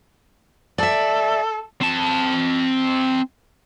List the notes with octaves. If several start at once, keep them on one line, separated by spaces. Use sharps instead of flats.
A4 D5 E5
C4 A5